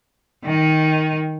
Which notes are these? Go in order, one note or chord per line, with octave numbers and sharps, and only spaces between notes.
D#3